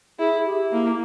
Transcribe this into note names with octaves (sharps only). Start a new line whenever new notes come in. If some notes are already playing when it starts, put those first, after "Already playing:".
E4 G#4
G4
A#3 E4